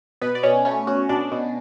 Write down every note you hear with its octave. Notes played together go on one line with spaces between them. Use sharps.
B2 B3 B4
D5
B2 C#4 C#5
A3 C#4 C#5
C#4 F#4
B2 D4 D5
B2